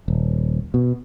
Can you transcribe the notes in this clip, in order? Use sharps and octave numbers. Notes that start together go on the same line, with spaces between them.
D#1
B2